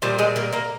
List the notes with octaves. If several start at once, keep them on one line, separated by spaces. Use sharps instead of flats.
A#2 F3 G3 F4
G#3 G#4
A#3 A#4
A#3 A#4